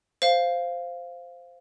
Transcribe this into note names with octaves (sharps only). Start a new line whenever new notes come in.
C5 F5